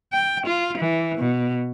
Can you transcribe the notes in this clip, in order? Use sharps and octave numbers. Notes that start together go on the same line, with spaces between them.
G5
F4
E3
B2